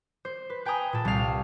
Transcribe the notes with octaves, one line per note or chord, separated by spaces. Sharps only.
C5
B4
B4 G5 G#5 A#5 D#6
A#2 A4
C2 F5